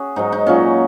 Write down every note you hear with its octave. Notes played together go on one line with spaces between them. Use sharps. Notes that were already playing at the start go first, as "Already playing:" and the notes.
Already playing: C#4 F#4 G#4
G#2 F#3 D#4
D#4
A#2 F#3 C#4